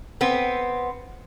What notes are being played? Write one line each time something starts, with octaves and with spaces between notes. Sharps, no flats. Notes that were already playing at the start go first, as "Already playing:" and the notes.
B3 C4